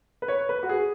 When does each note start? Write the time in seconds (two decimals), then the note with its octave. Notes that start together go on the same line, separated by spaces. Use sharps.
0.22 B4
0.28 C#5
0.49 B4
0.63 F#4
0.69 G#4